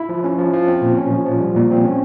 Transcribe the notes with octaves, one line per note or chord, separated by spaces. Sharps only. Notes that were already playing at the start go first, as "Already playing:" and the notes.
Already playing: E4
F3
C#4
F3
F3
C4
A#2
C#4
F3
F3
G3
A#2
C4
C#4